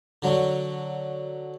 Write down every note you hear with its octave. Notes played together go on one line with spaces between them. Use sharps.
D3 F#3